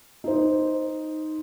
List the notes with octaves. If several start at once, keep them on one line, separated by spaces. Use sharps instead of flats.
D#4 C5